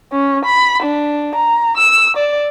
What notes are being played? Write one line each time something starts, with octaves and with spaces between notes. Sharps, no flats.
C#4
B5
D4
A#5
E6
D5